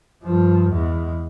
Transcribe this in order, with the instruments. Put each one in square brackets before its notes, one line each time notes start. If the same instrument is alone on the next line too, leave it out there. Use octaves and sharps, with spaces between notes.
[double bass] G2 F3
E2 G#3